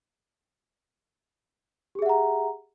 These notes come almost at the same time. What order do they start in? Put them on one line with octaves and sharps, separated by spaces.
G4 G#4 E5 F#5 A#5